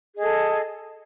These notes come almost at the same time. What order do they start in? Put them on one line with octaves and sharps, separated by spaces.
G#4 D#5 A4